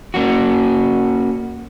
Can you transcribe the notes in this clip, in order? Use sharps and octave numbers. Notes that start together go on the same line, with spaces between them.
A#3 C#4 F#4